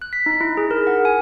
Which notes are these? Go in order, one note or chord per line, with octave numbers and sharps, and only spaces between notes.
F#6
B6
D#4
E4
G#4
A#4
F#5
G#5